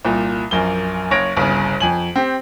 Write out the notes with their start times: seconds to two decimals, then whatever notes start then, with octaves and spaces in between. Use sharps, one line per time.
0.05 C2 A#2
0.51 A#1 F#2 A#3 G7
1.11 F#1 C#5 A#6 D7
1.37 G1 C2 C#3
1.80 F2 G#5 F#7
2.16 C4 G4